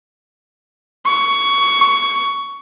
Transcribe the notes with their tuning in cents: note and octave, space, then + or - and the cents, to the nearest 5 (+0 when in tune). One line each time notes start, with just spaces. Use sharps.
C#6 +15